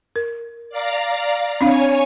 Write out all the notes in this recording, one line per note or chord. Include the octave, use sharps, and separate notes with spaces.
A#4
D5 F5 A#5
C4 D4 C#5 F5 G#5